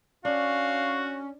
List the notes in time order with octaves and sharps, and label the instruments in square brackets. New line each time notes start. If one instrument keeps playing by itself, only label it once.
[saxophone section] C#4 [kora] D4 [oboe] F#4 [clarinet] F5